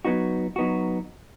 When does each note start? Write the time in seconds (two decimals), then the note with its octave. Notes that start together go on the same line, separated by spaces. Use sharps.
0.05 F#3 B3 D#4 F#4
0.56 F#3 B3 D#4 F#4